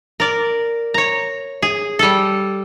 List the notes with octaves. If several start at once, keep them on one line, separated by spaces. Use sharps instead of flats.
A#4 D5
C#5 A#5
G#4
G3 A4